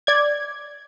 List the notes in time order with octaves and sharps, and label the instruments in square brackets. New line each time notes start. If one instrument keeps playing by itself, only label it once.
[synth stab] D5 G#6